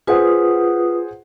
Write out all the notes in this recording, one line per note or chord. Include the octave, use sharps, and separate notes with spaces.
F4 G#4 B4 C5 F#5 D#6